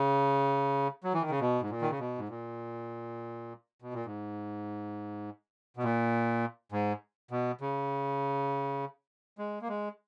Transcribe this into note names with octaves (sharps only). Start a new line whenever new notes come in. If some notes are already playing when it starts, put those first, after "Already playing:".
Already playing: C#3
F#3
E3
D#3
C#3
B2
G#2
A#2
D#3
C#3
B2
G#2
A#2
B2
A#2
G#2
B2
A#2
G#2
B2
C#3
G#3
A#3
G#3